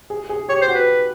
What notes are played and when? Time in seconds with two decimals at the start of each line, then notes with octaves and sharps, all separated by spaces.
0.10 G#4
0.29 G#4
0.49 G4 C#5
0.61 C5
0.68 F#4
0.74 B4